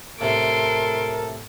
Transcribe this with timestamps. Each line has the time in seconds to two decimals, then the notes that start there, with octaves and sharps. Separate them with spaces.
0.21 A2 C3 A3 A4 A#4 C6 D7